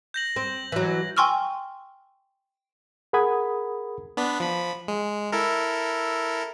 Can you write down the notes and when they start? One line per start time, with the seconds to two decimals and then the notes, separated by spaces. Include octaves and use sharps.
0.14 G6 A#6 F#7
0.36 C4
0.72 E3 F#3
1.17 G5 G#5 C6 C#6 E6 F6
3.13 G#4 A#4 F#5 B5 D#6 G#6
4.17 B3 D4 B6
4.40 F3 B5
4.88 G#3
5.32 E4 A4 A#4